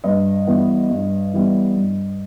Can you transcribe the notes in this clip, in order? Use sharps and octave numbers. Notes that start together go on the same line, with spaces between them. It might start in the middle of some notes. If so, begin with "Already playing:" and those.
G2 B4 D#5
E3 G3 B3
G2
E3 G3 B3
G2